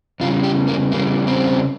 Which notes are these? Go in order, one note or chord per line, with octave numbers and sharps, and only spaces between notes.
E2 C#3 G3 F4
G4
A#3
E2 C#3 G3 A#3
C4